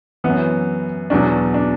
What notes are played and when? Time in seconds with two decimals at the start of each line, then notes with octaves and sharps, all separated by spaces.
0.24 F#2 E3 B3
1.10 E2 B2 F#3 D4
1.54 D4